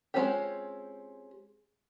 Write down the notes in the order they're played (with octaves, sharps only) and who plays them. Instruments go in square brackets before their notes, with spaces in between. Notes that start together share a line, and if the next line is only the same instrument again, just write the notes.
[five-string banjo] G#3 C4 C#4 F4 G4